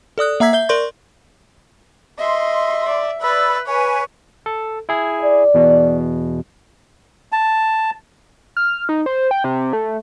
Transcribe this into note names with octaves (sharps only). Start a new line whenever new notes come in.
A4 D5 D#6 F#6
A#3 E5 A#5 E6 G#6 B6
E5 G6 G7
A#4 D5 C6 C#6 G6
D#5 E5 C6
D5
B4 D5 B5 E6
B4 C#5 G#5
A4
E4 G#4
D5
E2 B2
A5
F6
D#4
C5
G5
C3
A3